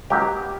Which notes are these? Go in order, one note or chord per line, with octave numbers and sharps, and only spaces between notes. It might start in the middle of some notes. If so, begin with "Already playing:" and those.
C#2 C#3 F#3 A#3 G4